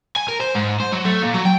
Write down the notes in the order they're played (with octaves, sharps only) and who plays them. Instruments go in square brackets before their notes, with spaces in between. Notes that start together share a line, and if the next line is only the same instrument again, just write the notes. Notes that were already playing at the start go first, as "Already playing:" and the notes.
[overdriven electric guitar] G#5
A#4
C5
G#2
C5
F#3
A3
A#2
F#3
G5